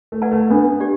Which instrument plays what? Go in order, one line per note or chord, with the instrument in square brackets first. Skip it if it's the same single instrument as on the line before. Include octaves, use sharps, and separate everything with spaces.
[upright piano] A3
[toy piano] B4 D5 F#5 A5
[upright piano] A3
[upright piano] B3 [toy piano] D4
[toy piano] G4 D5